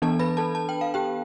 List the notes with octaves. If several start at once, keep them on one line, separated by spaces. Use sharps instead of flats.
E3 B3 D4 A4 A5
B4 B5
A4 A5
A5
G5
F5
G4 G5